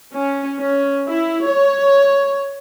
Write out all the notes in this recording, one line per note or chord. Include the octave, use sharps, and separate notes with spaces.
C#4
C#4
E4
C#5